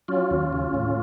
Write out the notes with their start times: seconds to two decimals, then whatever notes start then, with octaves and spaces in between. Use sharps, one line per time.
0.08 F#3 C#4 F4
0.31 D#2
0.53 C#3
0.74 A2